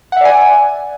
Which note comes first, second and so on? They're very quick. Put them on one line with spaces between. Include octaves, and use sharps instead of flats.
F#5 E5 D5 G#5